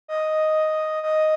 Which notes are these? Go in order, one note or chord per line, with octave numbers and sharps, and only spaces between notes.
D#5
D#5